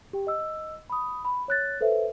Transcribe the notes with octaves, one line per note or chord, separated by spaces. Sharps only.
G4 G5
D#5 E6
B5 D#6
B5
C#5 F#6 A6
A4 B4 C5 E5